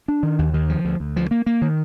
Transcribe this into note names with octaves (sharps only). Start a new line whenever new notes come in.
D4
D#3
D#2
D#3
F3
D2
D2
F3
A#3
A#3
D#3